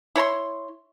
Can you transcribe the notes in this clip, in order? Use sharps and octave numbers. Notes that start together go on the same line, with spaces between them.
E4 C#5 A#5 C6